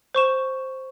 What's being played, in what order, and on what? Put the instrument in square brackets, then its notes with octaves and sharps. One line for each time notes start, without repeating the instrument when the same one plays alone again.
[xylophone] C5 C#6 E7